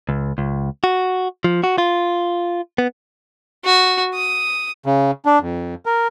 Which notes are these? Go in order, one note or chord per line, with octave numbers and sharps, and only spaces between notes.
C#2
C#2
F#4
F3
F#4
F4
B3
F#4
D#6
C#3
D4
F2
A#4